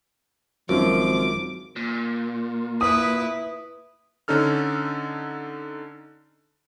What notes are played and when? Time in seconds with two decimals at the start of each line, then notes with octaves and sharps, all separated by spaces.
0.69 G#1 F#2 F3 D6
1.76 A#2
2.81 E4 B4 D#6
4.28 D3 C#4 D#4 A4 F6